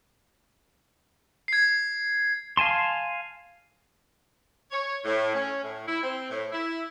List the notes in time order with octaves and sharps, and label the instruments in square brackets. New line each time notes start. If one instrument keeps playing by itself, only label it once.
[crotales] G#6 C7
[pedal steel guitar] F5 G#5 A5 C6
[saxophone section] C#5
A2
C#4
A2
E4
C4
A2
E4